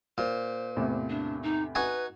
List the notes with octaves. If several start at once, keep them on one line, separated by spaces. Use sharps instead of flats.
A#2 C5
E2 A2 C3
D4
D#4
D#4 F#4 B4 G#5